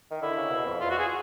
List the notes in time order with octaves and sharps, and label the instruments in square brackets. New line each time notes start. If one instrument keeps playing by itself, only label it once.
[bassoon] D#3
[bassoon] D3 [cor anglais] E4
[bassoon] C#3
B2
F2
[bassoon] E2 [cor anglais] F4
[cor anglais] F#4
G#4